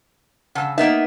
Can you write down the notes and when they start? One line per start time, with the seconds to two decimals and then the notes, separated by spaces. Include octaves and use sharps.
0.55 C#3 F#5 A5 E6
0.78 A#3 B3 D#4 E5